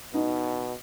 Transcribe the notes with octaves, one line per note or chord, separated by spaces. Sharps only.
B2 D#4